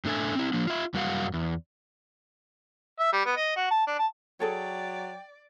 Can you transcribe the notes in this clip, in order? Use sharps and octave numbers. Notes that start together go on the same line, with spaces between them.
A2 D4 A4 E5 G#5
C4 E4
F3 A#3 D4
F4 E5
F#2 G3 F#4 A#4 F5 F#5
E2
E5
G3
B3
D#5
F#4
A5
D4
A5
F#3 G#4 A4 C#5 D5 G5